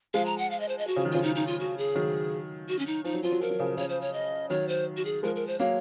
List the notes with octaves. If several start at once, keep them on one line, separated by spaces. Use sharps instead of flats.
F3 G#3 F5
A#5
F#5
F5
D#5
C5
D#5
F#4
C#3 F3
D#3 F#3
C#3 F3 F4
D#4
D#4
F4
F#4
G#4
D#3 F#3
F#4
C#4
D#4
F3 D#4
F#3
F3 F4
F#3
F3 A#4
F#3
C#3 F3
C#3 F3 C#5
C5
C#5
D#5
D#3 F#3 C#5
C5
F#4
G#4
F3 G#3 A#4
A#4
C5
F#3 A#3 C#5